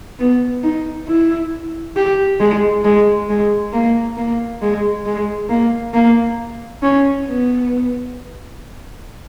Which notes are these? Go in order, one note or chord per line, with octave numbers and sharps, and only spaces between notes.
B3
D#4
E4
G4
G#3
G#3
G#3
A#3
A#3
G#3
G#3
A#3
A#3
C#4
B3